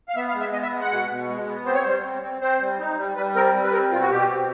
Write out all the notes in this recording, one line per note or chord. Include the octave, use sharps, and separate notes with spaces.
F5
B3 E5
F5
G#3
E5
B3 D#5
E5
G#3
F#5
B2
B2
G#3
B3
C4 C5
C#5
G3 C5
C4
C4
C4 C5
G3
D#4
G3
G3 B4
C4 A#4
G3
B4
C4 A#4
B2 F4
F#4
B2 G4
C4